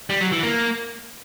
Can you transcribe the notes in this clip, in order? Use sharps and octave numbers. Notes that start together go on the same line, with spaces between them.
G3
F#3
E3
A#3